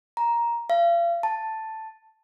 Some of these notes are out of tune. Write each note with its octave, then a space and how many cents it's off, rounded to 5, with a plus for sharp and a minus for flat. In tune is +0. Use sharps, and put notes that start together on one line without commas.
A#5 +10
F5 -35
A5 +5